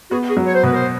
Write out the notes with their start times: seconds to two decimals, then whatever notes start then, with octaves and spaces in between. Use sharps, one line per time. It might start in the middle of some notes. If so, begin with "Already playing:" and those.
0.11 B3 F#4 G#4
0.28 F#4 G#4
0.37 F#3
0.46 C#5
0.54 C5
0.63 B2 B4
0.73 A#4 C5